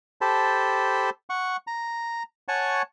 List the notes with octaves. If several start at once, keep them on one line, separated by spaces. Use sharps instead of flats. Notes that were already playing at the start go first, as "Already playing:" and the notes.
G4 A4 C5 A5 B5
F#5 C#6
A#5
C#5 F#5 G#5 A5 C#6